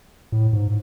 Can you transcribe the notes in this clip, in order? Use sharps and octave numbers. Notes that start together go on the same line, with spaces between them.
A2
G#2